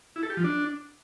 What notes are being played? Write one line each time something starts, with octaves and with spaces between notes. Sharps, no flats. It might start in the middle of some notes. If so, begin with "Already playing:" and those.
E4
A4
G4
F3
D4